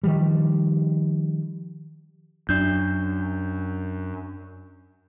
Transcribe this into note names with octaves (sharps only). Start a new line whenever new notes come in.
D#3 F3 G3
F#2 D4 G6